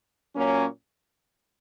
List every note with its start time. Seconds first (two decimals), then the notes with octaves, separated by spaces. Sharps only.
0.35 A#2 F#3 A#3 C#4